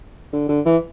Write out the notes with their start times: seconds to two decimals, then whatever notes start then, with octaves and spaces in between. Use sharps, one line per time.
0.33 D3
0.49 D3
0.66 E3